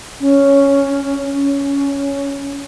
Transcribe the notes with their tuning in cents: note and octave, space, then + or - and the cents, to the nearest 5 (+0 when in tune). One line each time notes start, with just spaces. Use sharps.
C#4 +0
C#4 +10